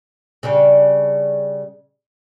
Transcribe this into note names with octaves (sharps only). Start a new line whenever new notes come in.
C#3 G3 D4